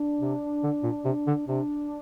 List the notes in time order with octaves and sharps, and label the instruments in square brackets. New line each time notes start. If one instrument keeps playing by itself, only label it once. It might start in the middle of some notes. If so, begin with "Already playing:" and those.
Already playing: [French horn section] D4
[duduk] C3
D3
A#2
C3
D3
[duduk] C3 [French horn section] D4